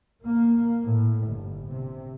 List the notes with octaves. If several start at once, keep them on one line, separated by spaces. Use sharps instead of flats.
A#3
A2
G1
C3